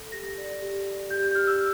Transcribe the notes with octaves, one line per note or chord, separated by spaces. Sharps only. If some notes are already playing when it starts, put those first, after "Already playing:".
Already playing: A4
G4 A#6
D5
G4
D5
G4 G6
G6
G4 F6
E6